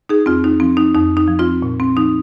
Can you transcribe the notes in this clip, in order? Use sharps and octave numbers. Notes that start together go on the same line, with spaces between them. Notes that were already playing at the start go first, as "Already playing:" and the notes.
D#4 G#4
F2 C4 F4
D#4
F3 C4
D#4
F2 D#4
D#4
F3
C4 F4
A#2
C4
F3 D#4